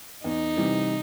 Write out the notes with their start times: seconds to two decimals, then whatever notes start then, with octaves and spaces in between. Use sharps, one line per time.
0.24 E2 D#4
0.57 C3 E3 G3